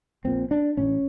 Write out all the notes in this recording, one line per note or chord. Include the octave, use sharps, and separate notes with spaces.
A#1 A#2 C4
D4
A1 A2 C#4